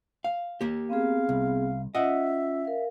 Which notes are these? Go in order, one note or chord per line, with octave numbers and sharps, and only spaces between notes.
F5
A#3 G4
B3 C4 G#4 F5
C2
C#4 F4 D#5 E5 F#5 E6
A#4 F5